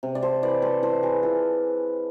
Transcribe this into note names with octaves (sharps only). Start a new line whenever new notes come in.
C3
D5
A4 C5
E3 B4 D5
A4 C5
E3 A4 C5
G#4 B4
E3 F4 A4